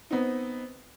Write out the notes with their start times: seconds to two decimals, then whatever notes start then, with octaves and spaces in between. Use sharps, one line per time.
0.11 B3 C4 D#4